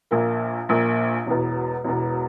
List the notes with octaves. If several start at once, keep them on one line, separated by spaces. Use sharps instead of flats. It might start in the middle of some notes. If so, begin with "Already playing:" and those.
A#1 A#2 A#3
A#1 A#2 A#3
E1 E2 B2
E1 E2 B2